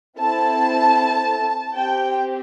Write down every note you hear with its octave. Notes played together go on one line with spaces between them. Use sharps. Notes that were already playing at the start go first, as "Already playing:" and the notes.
C4 E4 A4 A5
C4 G4 G5